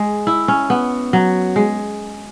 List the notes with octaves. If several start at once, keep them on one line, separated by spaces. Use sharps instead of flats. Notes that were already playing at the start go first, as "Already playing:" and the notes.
Already playing: G#3
E4
C#4
B3
F#3
G#3